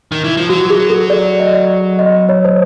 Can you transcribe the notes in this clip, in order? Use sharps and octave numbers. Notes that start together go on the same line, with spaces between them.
D#3
E3
F3
F#3 F#4
G#4
A4
D5
D#5
D#5
C#5
C5